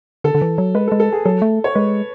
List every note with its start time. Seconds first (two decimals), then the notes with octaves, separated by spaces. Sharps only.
0.24 D3 A4
0.35 D3
0.42 E3
0.58 F#3
0.75 G#3 B4
0.87 A4
0.92 G#3
1.00 A4
1.12 G#4
1.25 F#3 A4
1.42 A3
1.64 C#5
1.75 G#3 B4